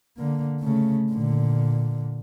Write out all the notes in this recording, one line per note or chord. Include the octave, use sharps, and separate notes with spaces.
D3 A#3
C#3 A3
A#2 D3